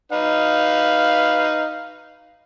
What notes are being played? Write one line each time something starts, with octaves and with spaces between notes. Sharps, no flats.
D#4 B4 F5